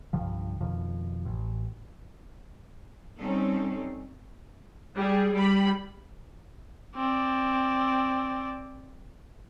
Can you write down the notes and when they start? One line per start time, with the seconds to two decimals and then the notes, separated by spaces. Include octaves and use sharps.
0.13 C2 G2 D3 F3
0.60 F2 B2 D#3 F3
1.25 A1
3.18 G3 C4 C#4 D#4 A4
4.96 G3 G#4
5.33 G3 B5
6.96 C4 D5